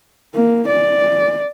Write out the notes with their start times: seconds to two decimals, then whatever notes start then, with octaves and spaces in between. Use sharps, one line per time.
0.35 A#3
0.68 D5